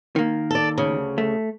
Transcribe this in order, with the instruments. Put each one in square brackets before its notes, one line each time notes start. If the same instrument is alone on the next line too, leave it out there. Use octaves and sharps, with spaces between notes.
[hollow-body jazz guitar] D#3 A#3
[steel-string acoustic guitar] A4 D5
D2 C#3
[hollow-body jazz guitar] A3